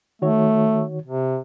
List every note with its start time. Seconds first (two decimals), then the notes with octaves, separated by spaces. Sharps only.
0.22 D#3 A3 F#4 C#5
1.06 C3